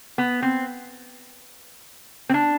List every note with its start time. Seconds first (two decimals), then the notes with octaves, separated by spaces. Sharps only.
0.18 B3
0.42 C4
2.29 C4
2.34 D4